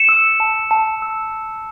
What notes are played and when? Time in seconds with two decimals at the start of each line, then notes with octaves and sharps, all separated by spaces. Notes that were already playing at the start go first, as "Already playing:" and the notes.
Already playing: C#7 E7
0.09 E6
0.40 A5
0.71 A5
1.02 E6